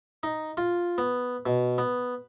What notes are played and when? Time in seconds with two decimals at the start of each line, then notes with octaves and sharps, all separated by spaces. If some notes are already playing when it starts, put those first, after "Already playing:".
0.23 D#4
0.57 F4
0.98 B3
1.46 B2
1.78 B3